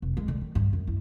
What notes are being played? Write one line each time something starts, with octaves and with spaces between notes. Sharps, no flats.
F1
G#3
D3
D#3
G2
F#2
E4